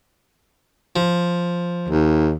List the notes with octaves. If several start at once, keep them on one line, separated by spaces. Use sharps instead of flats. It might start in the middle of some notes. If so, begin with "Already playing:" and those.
F3
D#2